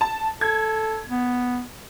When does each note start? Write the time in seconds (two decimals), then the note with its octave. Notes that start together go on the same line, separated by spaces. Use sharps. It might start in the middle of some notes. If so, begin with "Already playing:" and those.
0.01 A5
0.41 A4 G#6
1.09 B3